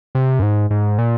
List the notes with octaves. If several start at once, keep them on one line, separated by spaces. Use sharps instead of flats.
C3
F#2
G#2
G#2
A#2